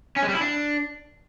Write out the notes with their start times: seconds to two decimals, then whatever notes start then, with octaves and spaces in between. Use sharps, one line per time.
0.16 C#4
0.22 G#3
0.29 G3
0.35 E4
0.41 D4